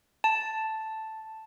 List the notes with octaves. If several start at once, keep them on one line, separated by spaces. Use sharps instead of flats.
A5